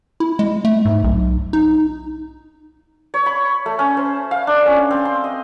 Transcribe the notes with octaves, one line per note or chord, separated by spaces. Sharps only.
E4
G#3
A3
G#2
B1
D#4
C#5
B5
A3
C#4
C5
F5
D4
C#4
C4
C6
D#5